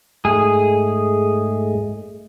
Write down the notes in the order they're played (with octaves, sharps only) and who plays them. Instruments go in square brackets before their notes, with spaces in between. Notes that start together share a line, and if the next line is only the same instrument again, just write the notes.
[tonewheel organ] G#2 G#3 A3 [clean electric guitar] G#4